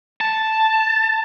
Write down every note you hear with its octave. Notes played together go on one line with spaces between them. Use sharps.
A5